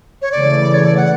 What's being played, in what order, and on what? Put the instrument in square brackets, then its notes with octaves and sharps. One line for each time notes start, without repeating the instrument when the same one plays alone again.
[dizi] C#5
[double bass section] C#3 E3 A3 [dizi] D5
[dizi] C#5
D5
F#5